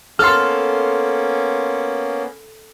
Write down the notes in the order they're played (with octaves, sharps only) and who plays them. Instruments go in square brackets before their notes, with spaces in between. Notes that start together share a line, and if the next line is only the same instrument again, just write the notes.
[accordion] A#3 B3 C#4 [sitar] A4 [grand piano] C6 F6